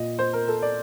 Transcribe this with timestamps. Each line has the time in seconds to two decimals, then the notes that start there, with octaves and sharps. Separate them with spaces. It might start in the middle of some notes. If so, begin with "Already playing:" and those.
Already playing: A#2 D#5
0.19 C5
0.33 A#4
0.48 A4
0.62 D5